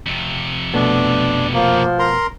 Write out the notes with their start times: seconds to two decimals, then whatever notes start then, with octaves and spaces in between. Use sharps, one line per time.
0.06 F2 C3
0.74 B2 A3 B3 D4
1.54 F3 A#3
1.99 A#4 A#5 C6